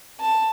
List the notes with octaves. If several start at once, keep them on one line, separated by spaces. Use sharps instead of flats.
A5